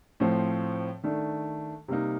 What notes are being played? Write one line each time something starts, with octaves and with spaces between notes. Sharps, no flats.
A2 F3 C4
D#3 A3 D4
C3 G3 A#3 D#4